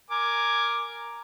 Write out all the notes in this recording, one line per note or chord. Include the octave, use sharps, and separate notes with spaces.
A#4 G#5 D6